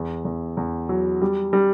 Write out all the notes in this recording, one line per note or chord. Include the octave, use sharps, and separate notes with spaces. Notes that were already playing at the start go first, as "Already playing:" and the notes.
Already playing: E2
E2
E2
F#3
G3
G3